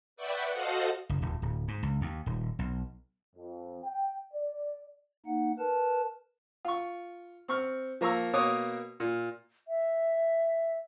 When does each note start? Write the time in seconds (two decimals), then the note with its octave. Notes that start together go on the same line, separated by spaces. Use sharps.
0.16 B4 D5 E5 F#5 G5 C#6
0.51 F#4 A4 C5 D#5 F5 F#5
1.09 F#1
1.22 D#1
1.42 D1
1.68 G#2
1.83 C#2
2.01 D#2
2.26 D#1
2.59 B1
3.36 F2
3.84 G5
4.34 D5
5.26 A#3 D#4 F#5
5.59 A#4 B4 A5
6.65 F4 C#6
7.48 C4 C#6 F6
8.01 F3 A#3 A#5 C#6 E6
8.33 B2 A#3 C#5 D6 D#6
9.00 A#2
9.68 E5